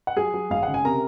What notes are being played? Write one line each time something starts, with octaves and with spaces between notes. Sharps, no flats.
F#5
F#3 G#4 G#5
F#3
G#1 F5
C#3 F#5
G#5
C3 A#4 A#5